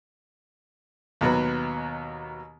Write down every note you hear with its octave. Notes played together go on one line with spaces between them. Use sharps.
D#2 B2 F#3 B4